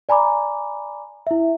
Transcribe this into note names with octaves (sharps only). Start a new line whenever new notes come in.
D5 G#5 A#5 B5 D6
E4 E5